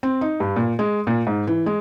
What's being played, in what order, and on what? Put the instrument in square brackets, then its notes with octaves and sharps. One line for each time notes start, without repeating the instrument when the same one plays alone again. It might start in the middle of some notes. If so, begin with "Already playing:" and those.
[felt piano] C4
D#4
G2
A#2
G#3
A#2
G#2
E3
G#3